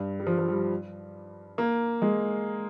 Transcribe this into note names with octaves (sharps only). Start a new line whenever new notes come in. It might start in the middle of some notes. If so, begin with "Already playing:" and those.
Already playing: G2
G3
F3
F3
G3
A#3
G#3